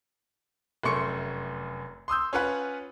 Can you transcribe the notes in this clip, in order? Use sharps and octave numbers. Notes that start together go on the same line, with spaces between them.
F1 F#2 A3 C6 C#6 C#7
C6 D#6 E6 G6
C#4 F4 B4 F#5